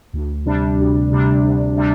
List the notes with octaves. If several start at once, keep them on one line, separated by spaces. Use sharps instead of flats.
D2
C3 G3 D4
D2
C3 G3 D4
D2
C3 G3 D4